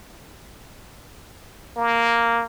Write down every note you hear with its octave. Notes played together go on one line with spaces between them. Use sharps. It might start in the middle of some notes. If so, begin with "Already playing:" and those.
A#3